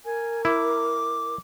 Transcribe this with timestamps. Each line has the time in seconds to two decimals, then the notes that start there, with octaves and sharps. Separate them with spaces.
0.05 A#4 G#5
0.45 E4 D6